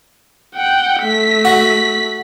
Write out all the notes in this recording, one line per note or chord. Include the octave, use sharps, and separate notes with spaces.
F#5 G5
A3 B6
F#4